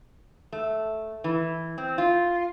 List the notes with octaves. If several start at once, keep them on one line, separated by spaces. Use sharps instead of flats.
A3
E3
C4
F4